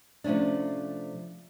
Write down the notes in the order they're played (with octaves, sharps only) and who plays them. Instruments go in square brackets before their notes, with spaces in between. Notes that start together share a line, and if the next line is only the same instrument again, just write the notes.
[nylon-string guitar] C3 F3 A3 C#4 D4